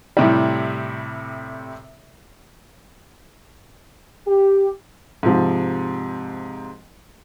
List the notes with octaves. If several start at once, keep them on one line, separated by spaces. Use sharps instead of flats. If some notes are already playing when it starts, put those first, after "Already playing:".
A2 C3 G3
G4
G#2 C3 F3